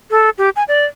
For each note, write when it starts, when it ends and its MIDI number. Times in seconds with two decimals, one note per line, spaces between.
0.11 0.30 69
0.38 0.50 67
0.56 0.64 80
0.68 0.85 74